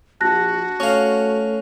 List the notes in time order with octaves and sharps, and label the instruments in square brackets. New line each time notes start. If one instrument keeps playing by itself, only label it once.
[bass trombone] A#1 [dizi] F#4 [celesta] A5 F#6 A#6
[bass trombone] A3 [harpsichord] C#4 F5